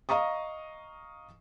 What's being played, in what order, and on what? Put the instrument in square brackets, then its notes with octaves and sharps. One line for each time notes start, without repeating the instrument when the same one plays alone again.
[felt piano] D#5 F5 A#5 C#6 D#6